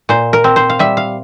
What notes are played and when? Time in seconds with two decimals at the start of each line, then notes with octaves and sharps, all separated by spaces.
0.09 A#2 C5
0.33 A#4
0.44 C4
0.56 C5
0.70 F5
0.79 G3 E5
0.97 F5